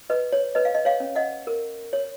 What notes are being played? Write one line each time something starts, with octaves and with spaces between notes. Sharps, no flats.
B4 D#5
C#5
B4 D#5
F5
D#5
C#5 F5
C#4
D#5 F#5
A#4
C#5